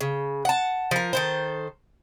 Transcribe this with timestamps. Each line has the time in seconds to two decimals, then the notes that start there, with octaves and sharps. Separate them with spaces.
0.01 C#3
0.45 F#5 A5
0.91 F3 A#4
1.13 D#3 A4 C5